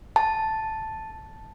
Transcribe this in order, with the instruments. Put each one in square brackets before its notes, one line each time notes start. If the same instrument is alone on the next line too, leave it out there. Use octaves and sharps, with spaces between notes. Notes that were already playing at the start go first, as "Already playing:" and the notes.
[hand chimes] A5